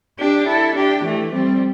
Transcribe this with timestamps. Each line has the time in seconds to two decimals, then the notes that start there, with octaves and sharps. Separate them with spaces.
0.18 D4 G4
0.47 E4 A4
0.75 D4 G4
1.04 E3 A3
1.32 G3 C4